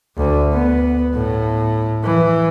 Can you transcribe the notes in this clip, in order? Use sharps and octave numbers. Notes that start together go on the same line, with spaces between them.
D2
B3
A2
E3